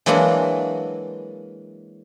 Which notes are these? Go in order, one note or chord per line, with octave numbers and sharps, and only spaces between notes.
E3 F#3 G#3 A#3 D4 F#4